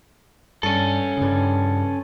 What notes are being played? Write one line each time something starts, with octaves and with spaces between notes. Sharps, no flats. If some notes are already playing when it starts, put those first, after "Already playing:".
G2 C#4 A4
G2 C#3